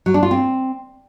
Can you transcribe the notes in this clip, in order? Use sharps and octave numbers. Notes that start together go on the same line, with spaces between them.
F#3
D4
F4
C4